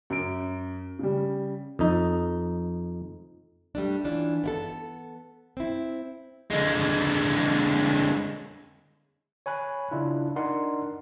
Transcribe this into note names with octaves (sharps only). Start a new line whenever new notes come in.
F#2 D7
C#3 G3
F2 D#4
G3 A3 D4
E3 C#4 D4 F4
B3 E4 A4
C4 E4
D3 G#3
C#5 G#5 B5 F#6
C#3 D4 E4 F4
D4 D#4 A#4 D5 F#5 C6